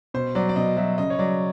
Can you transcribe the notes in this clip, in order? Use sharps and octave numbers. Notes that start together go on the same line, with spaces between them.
B2 C5
F#3 D5
D5
B2 D#5
F#3 E5
C#3 D#5
C#5
F#3 D5